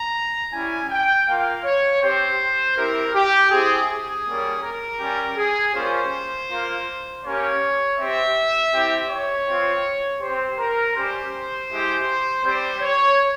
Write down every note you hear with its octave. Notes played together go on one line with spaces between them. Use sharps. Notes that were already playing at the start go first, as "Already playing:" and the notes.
Already playing: A#5
G3 C#4 E4 G#5
G5
A#3 F4 F5
C#5
C4 G4 C5
C4 E4 G4 A#4
G4
C4 E4 G4 G#4
G#4
G3 A#3 C#4
A#4
G3 C#4 G4
G#4
G3 A#3 C#4 F4 C5
A#3 F4
A#3 C#4 G4 C#5
C4 G4 E5
C4 E4 G4
C#5
C4 F4
C4 G4 C5
A#4
G3 C#4 G4 C5
G#3 E4 G4
G3 C4 G4 C5
C#5